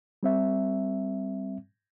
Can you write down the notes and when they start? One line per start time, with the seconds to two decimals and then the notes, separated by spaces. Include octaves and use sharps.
0.23 G3 C4 E5